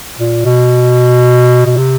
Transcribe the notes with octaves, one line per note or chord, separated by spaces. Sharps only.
A#2
B2
B2
C3